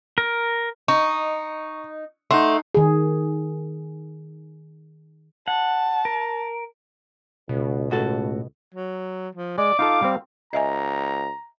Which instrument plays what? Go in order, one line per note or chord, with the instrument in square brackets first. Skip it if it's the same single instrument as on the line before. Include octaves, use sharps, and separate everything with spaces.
[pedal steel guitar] A#4
[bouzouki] D#4 [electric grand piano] C#6
[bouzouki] A3 [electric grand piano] D#4 F#5 C6
[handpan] D#3 G#4
[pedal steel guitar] F#5 [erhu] A5
[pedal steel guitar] A#4
[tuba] C#2 [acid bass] B2
[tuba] C#2 [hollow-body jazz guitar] A2 F#4 A4
[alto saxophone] F#3
F3
[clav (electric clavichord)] G#3 [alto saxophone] D5 [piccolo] D6
[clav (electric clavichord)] D#4 F4 A4 [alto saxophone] F5
[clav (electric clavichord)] G3 C4
[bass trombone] C#2 [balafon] D#5 E5 G#5 [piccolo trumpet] A#5